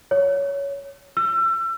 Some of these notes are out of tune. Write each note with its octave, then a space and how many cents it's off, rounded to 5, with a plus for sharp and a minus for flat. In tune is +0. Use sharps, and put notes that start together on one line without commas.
C#5 +15
E6 +35